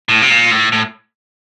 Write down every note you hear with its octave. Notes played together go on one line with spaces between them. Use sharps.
A2
C3
A#2
A2
A2